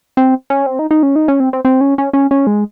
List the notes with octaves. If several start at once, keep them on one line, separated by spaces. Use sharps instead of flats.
C4
C#4
C4
D#4
D#4
C#4
D#4
C#4
C4
C4
C4
C#4
C#4
C#4
C#4
G#3